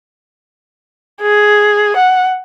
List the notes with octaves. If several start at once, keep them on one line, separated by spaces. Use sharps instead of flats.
G#4
F#5